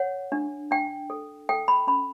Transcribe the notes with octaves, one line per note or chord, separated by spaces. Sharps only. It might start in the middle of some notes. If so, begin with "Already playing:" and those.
Already playing: C#5 F#5
D4
D4 G5
A4
A4 G5
B5
C#4 B5